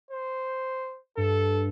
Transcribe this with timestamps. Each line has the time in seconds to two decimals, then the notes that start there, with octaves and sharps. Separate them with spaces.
0.11 C5
1.17 G2 A4